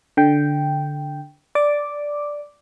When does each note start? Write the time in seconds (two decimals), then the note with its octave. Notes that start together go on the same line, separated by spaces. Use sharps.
0.17 D3 G5
1.55 D5 D6